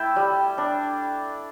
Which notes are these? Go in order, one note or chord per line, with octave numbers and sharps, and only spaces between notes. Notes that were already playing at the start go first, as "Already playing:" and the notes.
Already playing: A3 E4 E5 G5 A5
G3
D4